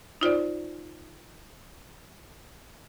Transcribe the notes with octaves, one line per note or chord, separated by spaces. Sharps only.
D#4 F4 C5 D5